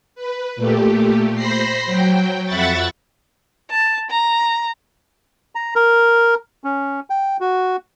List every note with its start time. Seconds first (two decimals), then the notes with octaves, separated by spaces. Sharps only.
0.15 B4
0.56 A#2 A3 G4
1.34 C5 B5 A#6 C7
1.86 F#3 G5
2.46 F2 E5 F#5 B5 C#6 A6
3.71 A5
4.10 A#5
5.55 A#5
5.75 A#4
6.64 C#4
7.10 G5
7.41 F#4